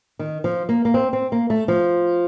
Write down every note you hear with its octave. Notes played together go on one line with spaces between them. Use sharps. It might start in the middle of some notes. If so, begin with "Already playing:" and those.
D#3
F3
A#3
A#3
C4
C4
A#3
A3
F3